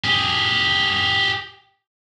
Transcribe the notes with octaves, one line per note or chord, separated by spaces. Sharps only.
G4 G#4